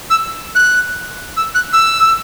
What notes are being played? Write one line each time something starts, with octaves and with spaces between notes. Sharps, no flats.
E6
F#6
E6
F#6
E6